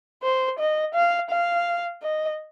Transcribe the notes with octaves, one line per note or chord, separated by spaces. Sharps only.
C5
D#5
F5
F5
D#5